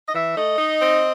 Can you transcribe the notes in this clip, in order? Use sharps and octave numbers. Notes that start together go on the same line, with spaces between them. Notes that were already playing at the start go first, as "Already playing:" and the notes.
D#5
E3 E5
A3 D#5
D#4
C4